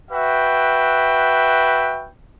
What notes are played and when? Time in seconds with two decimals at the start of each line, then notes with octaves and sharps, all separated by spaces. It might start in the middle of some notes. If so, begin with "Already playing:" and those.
0.11 F#4 B4 E5 G5